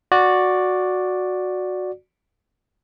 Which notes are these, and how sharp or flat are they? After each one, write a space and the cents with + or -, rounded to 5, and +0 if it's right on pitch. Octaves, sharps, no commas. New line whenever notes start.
F#4 -10 D5 +0